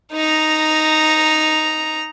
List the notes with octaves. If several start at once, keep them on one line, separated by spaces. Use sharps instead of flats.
D#4 A#5